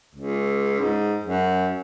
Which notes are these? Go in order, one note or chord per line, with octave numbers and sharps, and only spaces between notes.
C#2
G#2
F#2